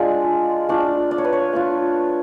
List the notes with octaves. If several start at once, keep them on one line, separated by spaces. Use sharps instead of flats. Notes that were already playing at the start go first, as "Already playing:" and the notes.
Already playing: G#3 D4 F4 D5
A3 D4 F4 D5
D5
C#5
B4
C#5
A3 D4 F4